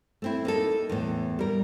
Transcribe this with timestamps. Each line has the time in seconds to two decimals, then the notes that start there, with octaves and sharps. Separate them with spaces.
0.22 A3 C4 E4
0.45 A#3 D#4 A4
0.89 E2 A2
1.39 G3 A#4